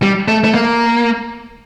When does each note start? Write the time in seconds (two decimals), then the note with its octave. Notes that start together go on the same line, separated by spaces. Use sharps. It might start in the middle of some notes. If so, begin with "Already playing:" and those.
0.03 G3
0.28 A3
0.44 A3
0.54 A#3